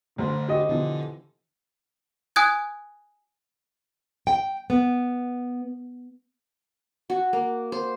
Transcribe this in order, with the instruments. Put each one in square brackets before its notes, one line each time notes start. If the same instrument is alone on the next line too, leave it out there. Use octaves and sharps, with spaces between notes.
[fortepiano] A1 C5 [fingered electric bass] D3
[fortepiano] F#4 C5 [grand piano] G4 D#5
[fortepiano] B2 E3 F3 [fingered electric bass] D3
[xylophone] G#5 D#6 F#6 G#6
[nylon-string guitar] G5
B3
[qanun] F#4
A#3
C5